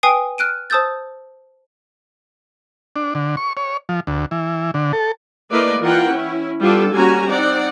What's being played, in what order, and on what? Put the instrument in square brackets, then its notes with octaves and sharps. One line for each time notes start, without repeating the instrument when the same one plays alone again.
[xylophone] B4 G5 G#5 D#6 C7 D7
F6 F#6 D7 D#7
C5 A5 D#6 E6 G6 A6
[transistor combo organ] D4
D3
C#6
C#5
F3
D2
E3
D3
A4
[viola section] A3 A#3 E4 B4 D5 D#5
E3 F4 A#4 F#5 G5
C#4 E4
G3 B3 D4 F4 A4
G3 A#3 C#4 F#4 G#5 A#5
C4 D#4 D5 F#5